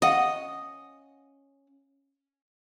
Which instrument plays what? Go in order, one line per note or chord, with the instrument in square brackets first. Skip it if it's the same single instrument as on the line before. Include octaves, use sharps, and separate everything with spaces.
[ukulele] C#4 F5 F#5 [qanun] D#5